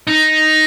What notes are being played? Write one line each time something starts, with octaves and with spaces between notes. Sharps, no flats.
D#4